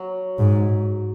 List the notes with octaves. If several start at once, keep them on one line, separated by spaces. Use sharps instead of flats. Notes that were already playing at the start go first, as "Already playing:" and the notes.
Already playing: F#3
G#2